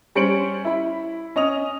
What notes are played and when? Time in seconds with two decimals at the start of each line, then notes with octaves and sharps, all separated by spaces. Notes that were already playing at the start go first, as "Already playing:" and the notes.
0.15 G3 C#4 C5 C#7 D7 F#7
0.65 E4 B5
1.36 C#4 D#5 D#6 F7